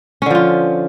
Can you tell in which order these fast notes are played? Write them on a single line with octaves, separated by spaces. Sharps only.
C#4 D3 F3 F4